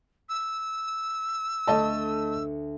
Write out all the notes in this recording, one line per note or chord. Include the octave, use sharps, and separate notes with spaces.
E6
D2 A3 D#5 A5